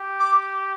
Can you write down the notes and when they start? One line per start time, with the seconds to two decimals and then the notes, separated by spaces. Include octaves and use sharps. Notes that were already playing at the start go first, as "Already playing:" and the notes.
Already playing: G4
0.19 D6